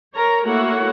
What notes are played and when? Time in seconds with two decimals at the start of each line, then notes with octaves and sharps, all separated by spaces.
0.13 A#4 C#5 A#5
0.42 A3 A#3 E4 F#4 C#5 F#5